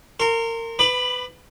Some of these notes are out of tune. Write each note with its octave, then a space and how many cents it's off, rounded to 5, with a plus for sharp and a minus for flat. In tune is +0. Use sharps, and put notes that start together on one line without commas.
A#4 -30 C6 +15
B4 +20 B5 +0 D6 +40